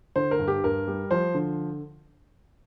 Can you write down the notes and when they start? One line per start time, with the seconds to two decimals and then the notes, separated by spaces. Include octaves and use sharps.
0.16 D3 C5
0.31 A#4
0.39 G2
0.48 G4
0.64 G2 A#4
0.88 G3
1.11 F3 C5
1.34 D3